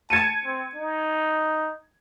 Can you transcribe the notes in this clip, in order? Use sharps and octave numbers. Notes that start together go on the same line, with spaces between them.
A5 G#6 C#7 D#7
C4
D#4